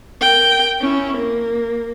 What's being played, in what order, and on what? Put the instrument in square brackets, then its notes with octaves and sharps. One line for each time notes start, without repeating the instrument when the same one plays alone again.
[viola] A#4 G5
C#4 E4
A#3